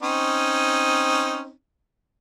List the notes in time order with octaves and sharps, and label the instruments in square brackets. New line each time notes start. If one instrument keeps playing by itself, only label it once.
[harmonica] C4 C#4 D#4